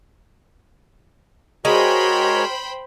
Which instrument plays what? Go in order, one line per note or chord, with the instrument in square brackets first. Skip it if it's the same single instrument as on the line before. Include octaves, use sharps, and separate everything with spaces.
[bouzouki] G#3 [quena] F#4 [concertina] G#4 A#4 C#5 [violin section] C5 G5 B5